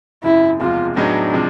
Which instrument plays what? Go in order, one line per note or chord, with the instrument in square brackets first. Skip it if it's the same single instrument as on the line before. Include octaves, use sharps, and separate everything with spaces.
[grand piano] G#1 F#2 C#3 [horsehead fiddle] E4
[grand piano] E2 C3 F3 G#3 [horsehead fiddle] F4
[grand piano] A2 F#3 B3 D#4 G#4 [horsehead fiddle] D4
[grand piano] C3 F3 G#3